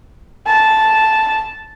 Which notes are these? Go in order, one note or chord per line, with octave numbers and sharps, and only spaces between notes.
A5